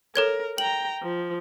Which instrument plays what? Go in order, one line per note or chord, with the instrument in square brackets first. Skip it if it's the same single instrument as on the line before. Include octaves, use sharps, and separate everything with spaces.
[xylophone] A4 C#5 G#6 [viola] A#4
[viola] G5 A#5 [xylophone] F#7
[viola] F3